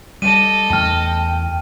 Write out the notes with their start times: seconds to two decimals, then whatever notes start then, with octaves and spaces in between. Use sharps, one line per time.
0.22 G3 A4 D#5 D#7
0.70 E2 A3 G5 A5 F6